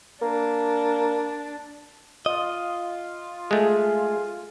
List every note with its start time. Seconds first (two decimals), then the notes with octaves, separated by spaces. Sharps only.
0.22 A#3 D4
2.26 F4 D#5
3.51 G#3 A3 G#4